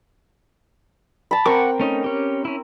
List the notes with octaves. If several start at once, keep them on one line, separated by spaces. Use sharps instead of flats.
A5 B5
C4 A#4 F#5 G5 C#6 D6
A3 C#4 D#4
C#4 G4
C#4 E4